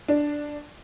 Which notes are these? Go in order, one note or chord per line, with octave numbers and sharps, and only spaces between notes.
D4